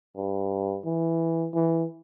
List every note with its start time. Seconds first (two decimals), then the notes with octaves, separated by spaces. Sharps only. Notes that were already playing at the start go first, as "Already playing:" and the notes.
0.16 G2
0.85 E3
1.55 E3